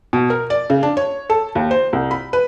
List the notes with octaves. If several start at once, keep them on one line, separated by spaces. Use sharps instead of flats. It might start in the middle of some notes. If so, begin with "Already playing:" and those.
B2
A#4
D5
C#3
D4
C#5
A4
D#2
C5
C2
B5
B4